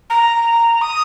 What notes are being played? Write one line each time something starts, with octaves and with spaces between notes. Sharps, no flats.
A#5
D#6